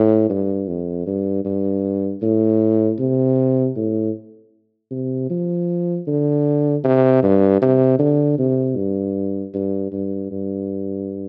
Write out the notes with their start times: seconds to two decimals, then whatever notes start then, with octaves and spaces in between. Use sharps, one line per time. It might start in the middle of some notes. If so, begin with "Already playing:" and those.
Already playing: A2
0.30 G2
0.68 F2
1.07 G2
1.45 G2
2.22 A2
2.99 C3
3.76 A2
4.91 C3
5.30 F3
6.07 D3
6.84 C3
7.23 G2
7.62 C3
7.99 D3
8.39 C3
8.76 G2
9.54 G2
9.92 G2
10.31 G2